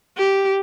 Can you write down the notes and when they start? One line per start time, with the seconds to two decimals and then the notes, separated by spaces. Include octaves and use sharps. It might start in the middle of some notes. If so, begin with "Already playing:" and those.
0.17 G4